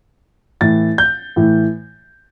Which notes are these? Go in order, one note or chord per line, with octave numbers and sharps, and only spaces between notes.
A2 E3 A6
G6
A2 E3